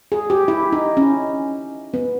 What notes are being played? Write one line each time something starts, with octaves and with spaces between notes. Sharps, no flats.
G#4
G4
E4
D#4
C#4
B3